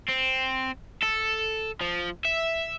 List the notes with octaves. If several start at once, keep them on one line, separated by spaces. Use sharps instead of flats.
C4
A4
F3
E5